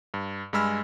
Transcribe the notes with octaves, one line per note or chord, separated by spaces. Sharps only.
G2
G2 G#3 G#5 B5 E6 F6